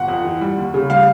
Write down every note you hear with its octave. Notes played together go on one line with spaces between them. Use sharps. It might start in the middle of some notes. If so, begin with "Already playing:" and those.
Already playing: G1 F#5
F2
E3
G3
D#2
C#3
G3 F5